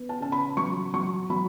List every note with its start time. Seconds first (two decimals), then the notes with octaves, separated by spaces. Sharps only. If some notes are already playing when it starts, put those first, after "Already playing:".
Already playing: B3
0.09 A5
0.20 C#3 A5
0.32 B5
0.57 F#3 C#6
0.94 F#3 C#6
1.30 F#3 B5